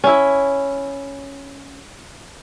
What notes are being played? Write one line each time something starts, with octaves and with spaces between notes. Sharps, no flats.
C#4 E4